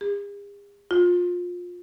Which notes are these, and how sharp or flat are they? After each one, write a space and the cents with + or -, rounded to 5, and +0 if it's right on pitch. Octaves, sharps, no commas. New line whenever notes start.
G#4 -45
F4 +25